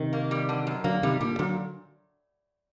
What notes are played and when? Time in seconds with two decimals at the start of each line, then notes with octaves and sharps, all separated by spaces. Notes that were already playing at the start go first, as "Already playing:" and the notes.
Already playing: C3 D#3
0.13 A#3
0.31 G3
0.49 D3
0.67 F#2
0.84 D3 F#3 A#3
1.02 C3 D#3 G3
1.21 A#2 D3 G3
1.39 A#2 D3 F#3